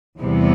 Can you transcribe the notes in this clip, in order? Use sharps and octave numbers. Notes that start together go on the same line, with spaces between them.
E2 C3 E3 G3 B3